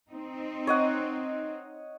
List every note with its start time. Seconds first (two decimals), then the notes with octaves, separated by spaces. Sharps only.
0.10 C4 D#4
0.67 C#5 D#5 F#5